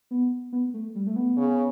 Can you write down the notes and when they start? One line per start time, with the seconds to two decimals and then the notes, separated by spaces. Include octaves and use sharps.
0.11 B3
0.52 B3
0.74 A3
0.95 G3
1.07 A3
1.16 B3
1.37 C#3